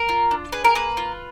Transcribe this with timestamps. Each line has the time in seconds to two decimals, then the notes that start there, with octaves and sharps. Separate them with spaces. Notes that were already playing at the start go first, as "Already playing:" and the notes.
Already playing: A#4
0.09 F4
0.31 D4
0.52 G#4 B4
0.64 A#4
0.75 A#3 B4
0.97 F4